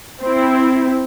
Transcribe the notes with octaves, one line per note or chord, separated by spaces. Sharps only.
C4 E4